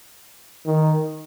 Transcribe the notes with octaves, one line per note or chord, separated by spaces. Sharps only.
D#3